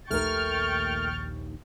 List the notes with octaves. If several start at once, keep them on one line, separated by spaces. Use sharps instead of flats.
A#1 D#2 A3 A#4 G5 C#6 F6 A6